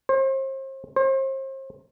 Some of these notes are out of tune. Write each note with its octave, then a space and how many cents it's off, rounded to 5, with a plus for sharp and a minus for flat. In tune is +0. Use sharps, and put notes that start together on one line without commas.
C5 +35
C5 +35